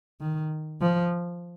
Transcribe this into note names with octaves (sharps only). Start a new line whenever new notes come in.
D#3
F3